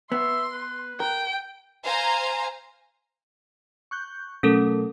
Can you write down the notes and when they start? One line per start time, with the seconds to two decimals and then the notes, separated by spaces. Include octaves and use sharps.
0.12 B3 E5 C6
0.52 B4
1.00 A#4 G5
1.84 C5 F5 G#5 A#5
3.91 C#6 F#6 G6
4.43 B2 F#3 A3 C#4 A4 A#4